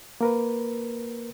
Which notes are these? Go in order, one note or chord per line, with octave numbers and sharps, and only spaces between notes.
A#3 A#4 B4